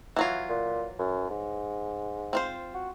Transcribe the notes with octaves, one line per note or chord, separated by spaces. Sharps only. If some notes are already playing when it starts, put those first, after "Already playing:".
E3 F#3 F4
A#2
F#2
G#2
C4 F4 C5
F#4